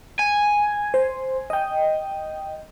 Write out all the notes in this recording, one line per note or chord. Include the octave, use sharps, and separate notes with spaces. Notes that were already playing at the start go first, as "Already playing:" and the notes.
G#5
C5
D#5 G5